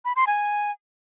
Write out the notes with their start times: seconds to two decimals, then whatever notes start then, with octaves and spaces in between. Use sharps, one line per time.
0.05 B5
0.16 C6
0.27 G#5